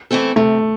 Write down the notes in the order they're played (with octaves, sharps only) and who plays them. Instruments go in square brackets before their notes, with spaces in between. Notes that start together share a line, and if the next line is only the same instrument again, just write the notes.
[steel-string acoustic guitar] E3 A3 C4 A4
[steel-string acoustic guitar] C3 [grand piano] A3